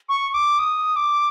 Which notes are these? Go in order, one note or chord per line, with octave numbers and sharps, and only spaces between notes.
C#6
D6
D#6
D6